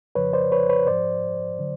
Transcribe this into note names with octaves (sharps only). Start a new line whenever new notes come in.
F2 C#3 F3 B4 C#5
C5 D5
B4 C#5
B4 C#5
G#2 F3 C5 D5
D3 F#3